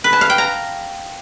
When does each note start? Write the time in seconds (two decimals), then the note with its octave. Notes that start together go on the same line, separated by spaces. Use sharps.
0.04 B4
0.13 A5
0.21 F5
0.30 G5
0.38 A#5